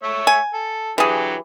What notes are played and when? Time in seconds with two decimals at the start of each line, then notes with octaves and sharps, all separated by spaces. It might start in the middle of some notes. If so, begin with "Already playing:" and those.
0.03 A3 C#5 E5
0.27 G#5
0.54 A4
0.98 D3 E3 F#3 G4 G#4